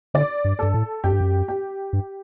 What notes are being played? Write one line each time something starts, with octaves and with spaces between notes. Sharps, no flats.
D3 D5
G2
G2 A4
A2
F#2 G4
G2
F#2
G4
G2